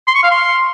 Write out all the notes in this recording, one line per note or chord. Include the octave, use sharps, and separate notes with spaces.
C6
C#6
F5
C6